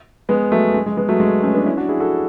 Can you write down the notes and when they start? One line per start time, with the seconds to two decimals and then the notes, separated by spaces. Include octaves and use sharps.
0.29 G#3 B3
0.52 F#3 A3
0.74 G#3
0.86 G#3
0.97 G#3 B3
1.09 F#3 A3
1.20 G#3
1.43 A3 C#4
1.54 B3 D4
1.66 C#4 E4
1.77 D4 F#4
1.89 E4 G#4
2.00 F#4 A4